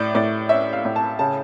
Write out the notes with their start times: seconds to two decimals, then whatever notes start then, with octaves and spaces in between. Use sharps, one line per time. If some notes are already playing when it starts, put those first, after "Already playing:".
Already playing: A2 D5
0.15 A2 D5
0.49 C#4 E5
0.73 F5
0.85 A2
0.96 A5
1.19 C#3 A5